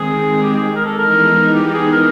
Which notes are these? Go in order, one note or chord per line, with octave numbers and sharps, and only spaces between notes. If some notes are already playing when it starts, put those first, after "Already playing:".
Already playing: D#3 G#3 C4 G#4
G4
G#4
A#4
A4
E3 G#3 B3 D#4 A#4
G4
G#4
A#4